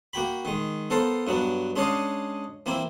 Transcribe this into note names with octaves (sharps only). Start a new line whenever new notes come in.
A#3 F#4 G5 B5
D#3 G#3
B3 A4 A#4 C5 F5
G2 F#3 B3 F#4
G#3 C#4 D4 C#5 D#5 F5
E3 A#3 C4 E4